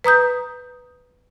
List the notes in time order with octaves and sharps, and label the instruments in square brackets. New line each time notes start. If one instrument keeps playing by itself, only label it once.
[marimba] B4 A#5 D#6 G6